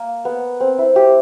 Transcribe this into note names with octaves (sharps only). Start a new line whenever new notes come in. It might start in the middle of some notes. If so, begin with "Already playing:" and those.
Already playing: A#3
B3
C4
E4
G4